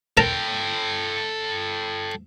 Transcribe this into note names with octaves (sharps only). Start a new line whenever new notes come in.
A4 A#4 G5 A5 A#5